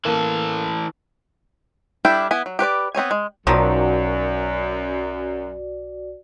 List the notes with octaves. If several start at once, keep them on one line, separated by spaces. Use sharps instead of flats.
E3 A#3 A4
G3 D4 E4 A4 G5
B3 E4 G#5
F#3
G4 B4 C#5 D5
B3 C4 C#5 G#5
G#3
B1 F#2 D#3 F3 F#3 F#4 D5